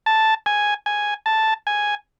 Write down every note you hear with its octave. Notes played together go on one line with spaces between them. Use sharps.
A5
G#5
G#5
A5
G#5